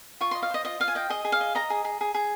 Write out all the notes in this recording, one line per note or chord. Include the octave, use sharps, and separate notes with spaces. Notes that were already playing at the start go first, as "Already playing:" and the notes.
F4 C#6
D#5 C6
F5
C5 D#5
F4 D#5
F4 F5
G#5
D#5 G5
G#4 D#5
G#4
F5
D#5
D#5 A#5
G#4
G#4
G#4
G#4